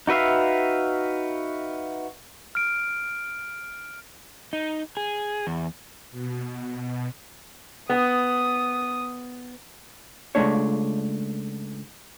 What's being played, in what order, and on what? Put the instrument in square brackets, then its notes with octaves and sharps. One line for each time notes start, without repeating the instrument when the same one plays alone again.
[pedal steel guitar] D#4 F#4 B4 E5 F5
[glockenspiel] F6 D7
[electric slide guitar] D#4
G#4
E2
[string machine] B2
[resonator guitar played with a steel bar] B3 [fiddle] D#6
[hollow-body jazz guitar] C#2 G#3 A3 D4 C#5